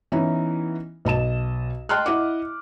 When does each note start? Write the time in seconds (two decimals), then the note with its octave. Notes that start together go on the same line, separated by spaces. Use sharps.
0.12 E3 B3 C#4 D#4 E4
1.05 B1 D#5 A5 E7
1.89 D#5 G5 A5 C6 F6 F#6
2.06 E4 D#5 F#5 D6